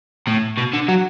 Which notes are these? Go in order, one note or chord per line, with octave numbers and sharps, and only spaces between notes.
A2
B2
D3
F#3